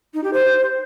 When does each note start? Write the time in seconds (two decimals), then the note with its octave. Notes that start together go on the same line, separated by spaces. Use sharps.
0.14 D#4
0.24 G4
0.33 C5